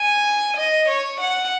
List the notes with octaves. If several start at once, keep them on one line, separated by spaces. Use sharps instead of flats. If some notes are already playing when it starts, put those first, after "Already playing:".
Already playing: G#5
D#5
C#5
F#5